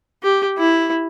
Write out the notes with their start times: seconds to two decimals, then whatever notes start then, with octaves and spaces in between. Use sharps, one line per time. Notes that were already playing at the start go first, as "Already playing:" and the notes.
0.23 G4
0.58 E4